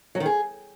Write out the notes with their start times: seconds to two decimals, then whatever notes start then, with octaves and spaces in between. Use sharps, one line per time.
0.15 F#3
0.20 D#3
0.26 G#4